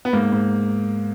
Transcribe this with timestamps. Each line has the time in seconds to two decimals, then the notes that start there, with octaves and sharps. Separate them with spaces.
0.05 B3
0.13 G#2 A#3
0.33 G#2